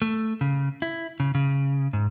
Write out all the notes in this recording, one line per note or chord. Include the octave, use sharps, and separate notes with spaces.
A3
C#3
E4
C#3
C#3
G#2